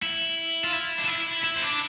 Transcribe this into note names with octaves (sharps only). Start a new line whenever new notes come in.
E4
F4
E4
D4
E4
E4
C4
D4